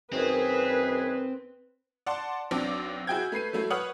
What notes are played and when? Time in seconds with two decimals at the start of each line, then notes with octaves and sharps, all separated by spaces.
0.13 F#2 D#3 C4 G#4 B4
2.06 D5 F#5 A5 C6
2.51 B1 C4 D4 D5 D6
3.07 E4 F#4 G#4 G5 G6 G#6
3.32 A3 B4 C7 D#7
3.53 F#3 A3 E4
3.70 B4 C#5 F#5 D#6 F6 F#7